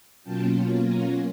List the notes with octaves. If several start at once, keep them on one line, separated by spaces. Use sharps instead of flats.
B2 F#3 A#3 C#4 F4 G5 A5
G#5 A#5